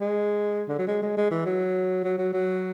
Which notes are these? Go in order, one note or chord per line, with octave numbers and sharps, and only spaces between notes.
G#3
D3
F#3
G#3
G#3
G#3
E3
F#3
F#3
F#3
F#3